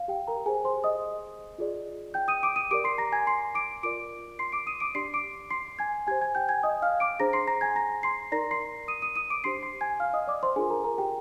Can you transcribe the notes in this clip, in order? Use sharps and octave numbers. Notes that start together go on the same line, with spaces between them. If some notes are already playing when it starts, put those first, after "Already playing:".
Already playing: F5
G4 G5
A#4 A#5
G4 G#4 C5 G#5
C5 C6
D#5 D#6
F4 G#4 D5
G5 G6
D#6 D#7
D6 D7
D#6 D#7
G4 A#4 D5 D6 D7
C6 C7
A#5 A#6
G#5 G#6
C6 C7
D6 D7
F4 A#4 D5 D6 D7
C6 C7
D6 D7
D#6 D#7
D6 D7
D4 G4 D5 C6 C7
D6 D7
C6 C7
G#5 G#6
G4 C5 G#5 G#6
G#5 G#6
G5 G6
G#5 G#6
D#5 D#6
F5 F6
D6 D7
D4 G#4 C5 A#5 A#6
C6 C7
A#5 A#6
G#5 G#6
A#5 A#6
C6 C7
D#4 A#4 D5 A#5 A#6
C6 C7
D#6 D#7
D#6 D#7
D#6 D#7
D6 D7
D4 G4 C5 C6 C7
C6 C7
G#5 G#6
F5 F6
D#5 D#6
D5 D6
C5 C6
D4 F4 G#4 A#4 G#5
A#4 A#5
A#4 A#5
G4 G5